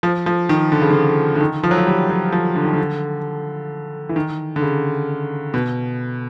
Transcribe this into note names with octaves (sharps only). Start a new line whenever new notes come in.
F3
F3
D#3
D3
C#3
D3
D3
D#3
F3
F#3
F3
G3
F#3
F3
D3
D#3
D3
E3
D#3
D3
C#3
B2